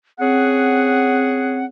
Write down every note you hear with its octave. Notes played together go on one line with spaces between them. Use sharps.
C4 C#4 G#4 F#5